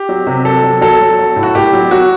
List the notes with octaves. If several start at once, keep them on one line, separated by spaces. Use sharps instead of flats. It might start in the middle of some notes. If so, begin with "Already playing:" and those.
Already playing: G4
F#3
C3
F#3 A4
F#3
F#3 A4
F#3
F#3
A2
F#4
A2 G4
F#3
F#3 F#4